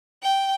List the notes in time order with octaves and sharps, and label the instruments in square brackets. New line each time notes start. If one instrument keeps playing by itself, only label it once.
[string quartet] G5